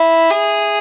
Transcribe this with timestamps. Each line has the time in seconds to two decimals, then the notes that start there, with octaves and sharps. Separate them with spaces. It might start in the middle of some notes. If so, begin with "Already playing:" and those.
Already playing: E4 E5
0.31 G#4